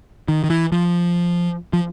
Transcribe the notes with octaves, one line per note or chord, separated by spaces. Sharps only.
D#3
D#3
E3
F3
F3